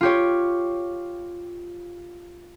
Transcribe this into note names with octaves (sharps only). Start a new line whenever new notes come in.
F4 G4 C#5